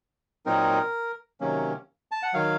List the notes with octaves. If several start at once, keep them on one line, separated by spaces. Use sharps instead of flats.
A#2 F#3 C4 D#4 A#4
C3 D#3 F#3 A#3 C#4
A5
F#5
D#3 F#3 F5